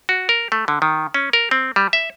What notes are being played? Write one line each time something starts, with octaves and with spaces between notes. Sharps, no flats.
F#4
A#4
A3
D3
D#3
C#4
A#4
C4
G3
E5